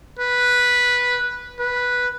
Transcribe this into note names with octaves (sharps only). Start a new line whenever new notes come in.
B4
B4